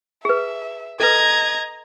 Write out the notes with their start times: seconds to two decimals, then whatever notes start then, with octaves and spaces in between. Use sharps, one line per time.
0.25 G#4 B4 E5
1.00 A4 B4 D#5 A#5 G#6